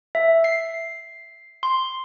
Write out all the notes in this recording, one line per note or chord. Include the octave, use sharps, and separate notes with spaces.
E5
C7
C6